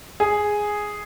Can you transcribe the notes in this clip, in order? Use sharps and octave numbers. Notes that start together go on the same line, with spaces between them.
G#4